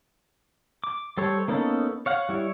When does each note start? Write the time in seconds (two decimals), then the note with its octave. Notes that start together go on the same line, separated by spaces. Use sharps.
0.84 D6
1.17 G3 A4 C5 C#5
1.48 A#3 B3 C#4 D#4 A4
2.06 C#5 F5 F#5
2.29 G3 E4 C#5